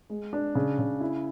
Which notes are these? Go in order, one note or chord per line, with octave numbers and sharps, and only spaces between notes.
G#3
D4
C#3
C#3
E4